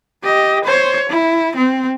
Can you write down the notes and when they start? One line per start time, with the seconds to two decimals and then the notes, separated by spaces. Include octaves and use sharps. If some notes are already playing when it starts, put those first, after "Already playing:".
0.24 G4 D#5
0.65 C5 C#5
1.10 E4
1.56 C4